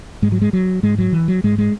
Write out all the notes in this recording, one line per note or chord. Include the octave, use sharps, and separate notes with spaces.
G#2 G#3
F#3
G#3
F#3
G#2 G#3
F#3
E3
F#3
G#2 G#3
G#3